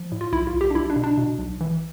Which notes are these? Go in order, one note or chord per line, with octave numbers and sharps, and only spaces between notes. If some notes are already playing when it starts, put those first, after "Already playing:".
Already playing: F3
A2
F4
B1 E4
F4
B1
G4
D4
B1 E4
D4
B2
D4
B2
B1
E3